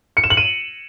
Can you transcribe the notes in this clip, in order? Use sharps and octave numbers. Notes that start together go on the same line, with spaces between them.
C#7
E7
F#7
D#7